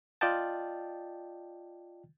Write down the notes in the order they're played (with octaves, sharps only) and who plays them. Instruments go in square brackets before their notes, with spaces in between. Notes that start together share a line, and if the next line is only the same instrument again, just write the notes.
[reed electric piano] F4 D5 D#5 G5 A5